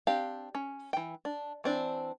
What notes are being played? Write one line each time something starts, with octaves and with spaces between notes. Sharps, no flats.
C4 D4 G4 F5
C#4
E3 G5
D4
E3 C4 D4